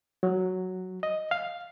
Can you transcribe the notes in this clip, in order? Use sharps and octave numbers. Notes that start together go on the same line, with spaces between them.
F#3
D#5
F5